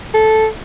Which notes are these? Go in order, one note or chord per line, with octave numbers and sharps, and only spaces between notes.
A4